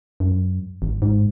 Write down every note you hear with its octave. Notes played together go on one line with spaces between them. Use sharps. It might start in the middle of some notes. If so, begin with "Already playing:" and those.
F#2
G#1
G#2